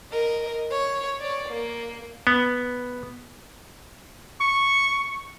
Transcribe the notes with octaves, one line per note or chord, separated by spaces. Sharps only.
A#4 D#5
C#5
C#5 D5
A#3
B3
C#6